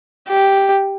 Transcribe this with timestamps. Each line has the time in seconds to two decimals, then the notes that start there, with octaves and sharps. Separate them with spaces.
0.28 G4